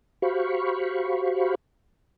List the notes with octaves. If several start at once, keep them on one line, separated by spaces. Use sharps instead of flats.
F#4 G4 C5 F5 B5 C#6